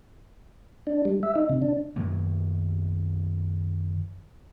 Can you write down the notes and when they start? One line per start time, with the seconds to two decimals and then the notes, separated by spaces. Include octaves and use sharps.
0.87 D4
1.05 G3
1.23 E5
1.36 D#4
1.49 C3
1.62 D4
1.96 F#2 D#3 F#3 A#3